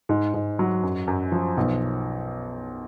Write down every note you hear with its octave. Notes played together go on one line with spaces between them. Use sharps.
G#2
G#2
F#3
F#2
F#2
F3
B1